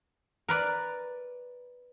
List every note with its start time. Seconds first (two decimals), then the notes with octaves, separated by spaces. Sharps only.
0.48 A#4 B4 D5